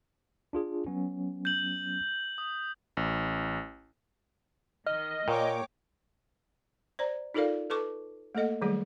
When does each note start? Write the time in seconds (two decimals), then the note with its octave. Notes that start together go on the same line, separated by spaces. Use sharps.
0.53 D4 F4 G#4
0.86 F#3 B3 C#4
1.45 G6 F#7
2.38 D#6
2.97 A1
4.86 D#3 D#5 F6
5.28 A#2 A#3 C#5 G5 C#6 D6
6.99 C5 D5 A#5
7.34 D#4 F4 A4 A#4 D5 F5
7.70 A4 B4 A5 C#6 D6
8.35 A3 A#3 A4 D#5 F#5
8.61 D#3 F#3 G3 A3 G#4